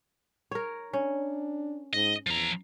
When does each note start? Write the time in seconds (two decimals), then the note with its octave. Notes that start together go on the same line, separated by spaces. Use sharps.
0.51 A#4 C#5
0.93 C#4 D4
1.93 G#2 D#5
2.27 E2 F3 A#5